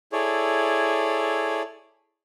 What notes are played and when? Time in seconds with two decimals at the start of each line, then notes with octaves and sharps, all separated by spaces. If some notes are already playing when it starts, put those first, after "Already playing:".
0.13 E4 G#4 A4 C#5 D5